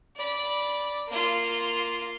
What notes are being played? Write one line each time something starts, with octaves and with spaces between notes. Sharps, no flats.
D5 B5
A#3 F4